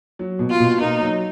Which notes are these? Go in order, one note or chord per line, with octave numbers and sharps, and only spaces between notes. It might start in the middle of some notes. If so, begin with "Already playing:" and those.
F#3
B2
F4
B2
A#3 D#4
F#3